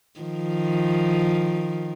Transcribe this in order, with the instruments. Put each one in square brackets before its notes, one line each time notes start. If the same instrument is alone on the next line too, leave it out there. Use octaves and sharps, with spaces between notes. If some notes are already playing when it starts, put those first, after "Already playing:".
[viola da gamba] D#3 F3